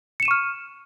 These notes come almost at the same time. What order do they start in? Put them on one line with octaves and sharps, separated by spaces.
C#7 E7 D#7 C#6 F6